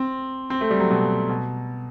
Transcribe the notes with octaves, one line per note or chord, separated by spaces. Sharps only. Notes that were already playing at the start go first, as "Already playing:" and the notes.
Already playing: C4
C4
A3
G3
F#3
B2
B2